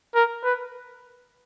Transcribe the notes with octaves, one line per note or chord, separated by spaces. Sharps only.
A#4
B4